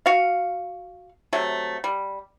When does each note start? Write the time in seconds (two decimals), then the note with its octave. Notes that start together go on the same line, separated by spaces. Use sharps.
0.06 F#4 F5
1.33 C3 F#3 A3
1.84 G3